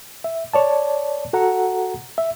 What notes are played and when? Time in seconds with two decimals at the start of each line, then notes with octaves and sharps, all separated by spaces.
0.24 E5
0.54 C#5 D5 A5
1.33 F#4 A4 F#5 A#5
2.18 E5